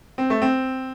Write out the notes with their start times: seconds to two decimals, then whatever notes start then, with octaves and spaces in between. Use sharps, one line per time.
0.18 C4
0.30 A3
0.42 C4